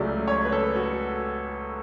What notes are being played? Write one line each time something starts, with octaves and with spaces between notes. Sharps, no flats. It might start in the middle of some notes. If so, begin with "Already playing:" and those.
Already playing: C#2 C#3 F#3 A3 D5
C#5
B4
A4
F#4